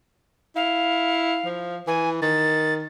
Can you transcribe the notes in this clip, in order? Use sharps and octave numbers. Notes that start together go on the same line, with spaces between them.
E4 F5
F3
E3 G#5
D#3 A6